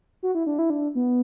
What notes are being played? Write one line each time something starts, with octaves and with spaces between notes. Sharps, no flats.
F#4
E4
D4
E4
D4
B3